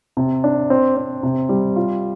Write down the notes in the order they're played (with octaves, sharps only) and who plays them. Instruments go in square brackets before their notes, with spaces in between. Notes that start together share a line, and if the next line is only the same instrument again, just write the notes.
[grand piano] C3
D4
C4
C4
C3
G3
F4